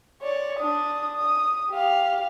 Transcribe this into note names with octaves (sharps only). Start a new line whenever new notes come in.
C#5 D5
D4 D#6
D#6
G4 F5